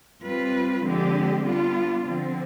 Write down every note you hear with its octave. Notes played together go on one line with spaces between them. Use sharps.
G3 C4 F4 B4
D3 F3 G#3 C4 G4
G3 B3 D4 F4
D3 F3 C4